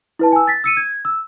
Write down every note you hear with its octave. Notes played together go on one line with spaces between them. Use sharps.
E4 B4 A5
G#5 E6
A6 B6
E6 C#7 D#7
G#6
E6